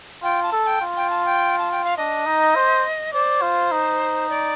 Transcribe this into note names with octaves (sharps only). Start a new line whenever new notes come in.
F4 G5
A5
A4
A5
G5
F4
G5
A5
G5
A5
G5
F5
D4 D#5
D#4
C5
C5 D5
F4
D#4
D5